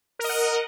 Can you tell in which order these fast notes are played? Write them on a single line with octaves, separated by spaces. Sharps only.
A#4 D#5 F#5